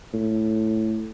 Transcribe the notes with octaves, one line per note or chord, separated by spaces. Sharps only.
A2